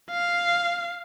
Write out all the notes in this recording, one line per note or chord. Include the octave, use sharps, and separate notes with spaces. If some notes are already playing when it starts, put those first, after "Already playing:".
F5